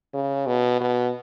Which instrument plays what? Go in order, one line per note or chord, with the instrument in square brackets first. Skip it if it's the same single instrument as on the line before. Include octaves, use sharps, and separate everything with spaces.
[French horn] C#3
B2
B2